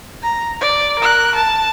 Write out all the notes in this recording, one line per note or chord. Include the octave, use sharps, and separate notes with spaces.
A#5
D5
A#4 F#6
A5